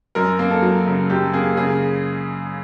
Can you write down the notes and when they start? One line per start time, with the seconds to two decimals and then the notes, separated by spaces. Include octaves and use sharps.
0.15 F#2 A#4
0.39 A#3
0.51 A4
0.62 F#3
0.86 C#3
1.10 F#2 G4
1.33 A#3 G#4
1.57 C#3 G#4